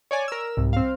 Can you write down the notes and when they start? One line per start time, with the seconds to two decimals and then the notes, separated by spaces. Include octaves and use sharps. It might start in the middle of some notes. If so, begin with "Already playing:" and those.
0.11 C#5 D5 G#5
0.28 A#4 E6
0.57 C2 G#2
0.73 C4 F5